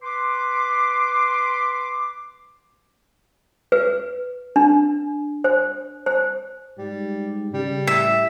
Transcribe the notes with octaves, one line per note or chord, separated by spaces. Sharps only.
B4 C6 D6
B4
D4
C5
C5
G#2 G3
C#3 G3
A2 E5